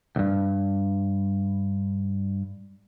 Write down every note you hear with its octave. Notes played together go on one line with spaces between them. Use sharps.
D2 G2